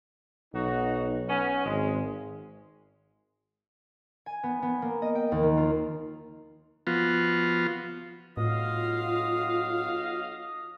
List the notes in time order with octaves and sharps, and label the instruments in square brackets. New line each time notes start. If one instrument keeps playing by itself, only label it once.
[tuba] B1 [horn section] D#4 F#4
[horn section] B3 C#4
[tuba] G#1 [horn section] G#3
[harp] G#5
B3
B3
A#3
D#5
G5
D#2
D#3
F4
[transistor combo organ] F3 B3 F4 F#4
[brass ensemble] B1 F#4 F5 [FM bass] A2 [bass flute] F4 [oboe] D#5